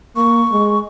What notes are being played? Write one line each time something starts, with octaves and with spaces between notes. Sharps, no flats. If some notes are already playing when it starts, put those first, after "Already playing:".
A#3 C#6
G#3